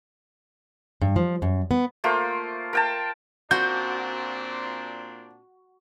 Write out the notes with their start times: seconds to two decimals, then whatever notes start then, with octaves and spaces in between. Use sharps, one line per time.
1.02 G2
1.16 F3
1.42 F#2
1.71 B3
2.04 A3 A#3 F4 C5
2.73 A#4 G5 A5
3.51 A#2 C4 D4 F#4 G6